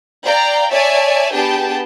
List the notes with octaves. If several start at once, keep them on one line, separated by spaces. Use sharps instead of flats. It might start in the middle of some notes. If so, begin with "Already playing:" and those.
D5 F5 G5 A#5
C#5 D5 E5 G#5 A5
B3 D4 G4 G#4 G5 A5